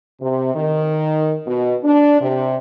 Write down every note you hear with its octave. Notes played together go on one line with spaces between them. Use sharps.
C3
D#3
B2
D4
C3